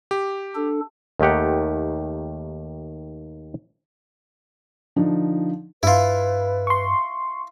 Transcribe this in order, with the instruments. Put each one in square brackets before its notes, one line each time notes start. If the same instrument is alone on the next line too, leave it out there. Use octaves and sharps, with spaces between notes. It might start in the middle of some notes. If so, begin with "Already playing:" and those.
[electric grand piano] G4
[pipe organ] D4 A4
[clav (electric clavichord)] D#2 D#3 A3 G4 F#5
[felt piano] D3 F3 D4 D#4
[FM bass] G2 [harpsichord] E4 F4 [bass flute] B4
[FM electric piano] C6 C#6